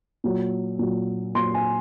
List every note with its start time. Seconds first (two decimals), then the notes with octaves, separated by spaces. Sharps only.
0.24 A#2 F#3
0.79 A#2 F#3
1.35 A#2 F#3 C6
1.54 G#5